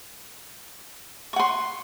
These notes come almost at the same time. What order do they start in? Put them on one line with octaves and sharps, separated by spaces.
C#6 F#5 C6